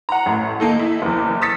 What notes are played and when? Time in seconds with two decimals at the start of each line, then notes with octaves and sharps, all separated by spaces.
0.09 F#5 A#5
0.26 A1 A3
0.60 D#3 A#3 D#4 A4
0.79 E4
1.02 F#1 E2
1.42 D#6 E6 A6 B6 C#7